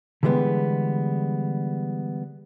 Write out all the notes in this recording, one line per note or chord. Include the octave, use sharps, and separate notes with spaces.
D3 E3 G3 G#3 B3